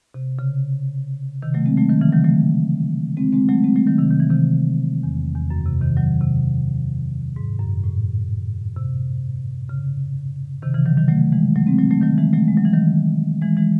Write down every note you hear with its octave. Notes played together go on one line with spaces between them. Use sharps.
C3
C#3
C3 D#3
F#3 A3
G#3 C4
F#3 A3
D#3 F#3
C#3 E3
D#3 F#3
F#3 A3
G#3 C4
G#3 C4
F#3 A3
G#3 C4
F#3 A3
D#3 F#3
C3 D#3
D#3
E3
C3 D#3
E2
E2
F#2
C3
C3 D#3
D#3 F#3
C3
G#2
F#2
A2
C3
C#3
C3 D#3
C#3 E3
D#3 F#3
D#3 F#3
F#3 A3
E3 G#3
F#3 A3
G#3 C4
F#3 A3
F#3 A3
D#3 F#3
E3 G#3
F#3 A3
G#3
F#3
E3
D#3 F#3
E3 G#3
E3 G#3